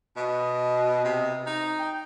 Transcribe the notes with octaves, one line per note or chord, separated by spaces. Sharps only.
B2 D#5
C3
D#4
G5